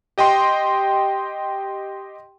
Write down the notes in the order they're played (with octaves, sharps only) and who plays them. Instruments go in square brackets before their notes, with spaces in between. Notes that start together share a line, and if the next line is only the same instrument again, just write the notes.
[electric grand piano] G4 D#5 G5 C6